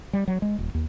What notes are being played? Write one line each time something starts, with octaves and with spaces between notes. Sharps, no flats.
G3
F#3
G#3
D#1
D#2